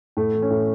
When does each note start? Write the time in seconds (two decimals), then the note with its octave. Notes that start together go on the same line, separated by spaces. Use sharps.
0.17 A2 A3
0.34 E3
0.42 C#4
0.50 A2